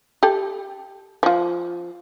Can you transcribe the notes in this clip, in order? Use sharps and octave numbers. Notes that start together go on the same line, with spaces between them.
G4 A4
F3 F4